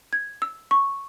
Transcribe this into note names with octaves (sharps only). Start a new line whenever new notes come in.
G#6
E6
C#6